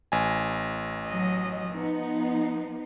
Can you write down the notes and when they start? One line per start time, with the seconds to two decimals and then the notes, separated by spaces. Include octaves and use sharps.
0.12 A1 G#5
1.07 F#3 D#5
1.71 F3 B3 D#4